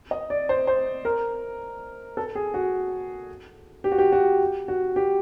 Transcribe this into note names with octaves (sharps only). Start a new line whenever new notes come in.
D#5
D5
C5
C5
A#4
A4
G#4
F#4
G4
F#4
G4
F#4
F#4
G4